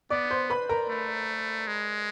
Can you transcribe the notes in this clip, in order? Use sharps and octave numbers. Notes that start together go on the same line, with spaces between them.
B3 D5 D6
C5 C6
B4 B5
A#4 A#5
A3
G#3